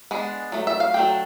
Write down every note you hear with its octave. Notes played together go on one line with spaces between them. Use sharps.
G#3 B3 D4
F#3 A3
E5
F5
F#3 A3 D4 G5